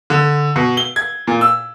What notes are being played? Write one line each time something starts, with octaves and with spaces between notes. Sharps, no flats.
D3
B2
G7
G#6
A#2
E6